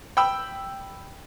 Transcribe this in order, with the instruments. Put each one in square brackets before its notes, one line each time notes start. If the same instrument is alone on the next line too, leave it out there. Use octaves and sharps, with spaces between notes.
[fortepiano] G5 B5 E6